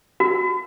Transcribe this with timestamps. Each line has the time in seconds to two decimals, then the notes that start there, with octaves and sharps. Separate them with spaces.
0.20 F#4